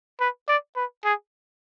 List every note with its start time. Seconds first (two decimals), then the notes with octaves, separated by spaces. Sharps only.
0.20 B4
0.48 D5
0.76 B4
1.05 G#4